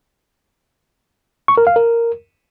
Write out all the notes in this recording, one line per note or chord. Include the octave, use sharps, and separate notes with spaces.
C#6
A#4
F5
A#4